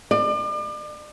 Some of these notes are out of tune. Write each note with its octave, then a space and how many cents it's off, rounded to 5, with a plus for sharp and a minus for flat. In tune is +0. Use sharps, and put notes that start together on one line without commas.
D5 +40